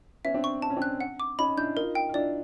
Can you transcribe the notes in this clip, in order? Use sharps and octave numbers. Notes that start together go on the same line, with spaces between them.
B3 C#4 E5
C4 D4
C#6
D4 A5
C#4
C4 D4
F#6
F#5
D6
C#4 D#4 B5
D4 E4 G6
D#4 F4 A#4
G5
F4
D4 E4 D5